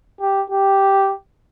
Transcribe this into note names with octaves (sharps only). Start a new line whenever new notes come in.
G4
G4